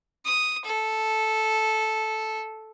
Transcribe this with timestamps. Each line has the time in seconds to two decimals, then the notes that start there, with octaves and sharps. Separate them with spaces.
0.25 D#6
0.65 A4